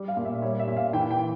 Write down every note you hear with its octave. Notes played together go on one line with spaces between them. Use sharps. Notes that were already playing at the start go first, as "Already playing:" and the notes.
Already playing: G3
F5
A#2
E5
G3 C#5
E5
A#2
F5
E3 G5
G5